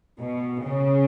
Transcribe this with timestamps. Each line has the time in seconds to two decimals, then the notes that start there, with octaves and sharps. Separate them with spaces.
0.19 B2
0.63 C#3